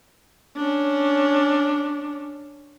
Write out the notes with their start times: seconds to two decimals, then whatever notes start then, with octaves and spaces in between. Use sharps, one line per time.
0.56 C#4 D4